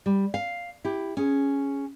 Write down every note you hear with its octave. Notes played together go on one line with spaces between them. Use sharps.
G3
F5
E4 G4
C#4 G#4